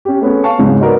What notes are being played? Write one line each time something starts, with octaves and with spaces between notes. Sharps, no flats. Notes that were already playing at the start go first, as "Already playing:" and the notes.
C#4 G4
A3 B3 C#4 G#4
F5 A5 C#6
E2 G#2 C#3 F#3
D#4 F#4 A#4 B4 D5